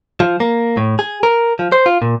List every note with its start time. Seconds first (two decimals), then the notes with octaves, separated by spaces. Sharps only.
0.20 F3
0.40 A#3
0.77 A2
0.99 G#4
1.23 A#4
1.59 F3
1.72 C5
1.86 F4
2.02 A#2